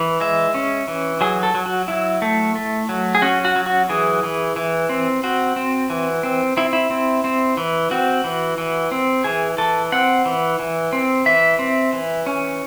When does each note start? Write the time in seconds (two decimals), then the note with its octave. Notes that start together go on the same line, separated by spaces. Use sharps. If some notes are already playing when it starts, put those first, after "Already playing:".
Already playing: E3
0.21 G#3 E5
0.54 C#4
0.88 E3
1.21 F#3 G#4
1.43 A4
1.55 F#3
1.66 F#4
1.88 F#3 E4
2.22 A3
2.55 A3
2.89 F#3
3.15 G#4
3.22 C#4 F#4
3.45 F#4
3.56 F#3
3.66 F#4
3.89 E3 G#4
4.23 E3
4.56 E3
4.89 C4
5.23 C4 F#4
5.56 C4
5.90 E3
6.23 C4
6.57 C4 E4
6.73 E4
6.91 C4
7.24 C4
7.57 E3
7.91 C4 F#4
8.24 E3
8.58 E3
8.92 C4
9.24 E3 G#4
9.58 E3 A4
9.92 C4 F#5
10.25 E3
10.59 E3
10.93 C4
11.26 E3 E5
11.59 C4
11.93 E3
12.26 C#4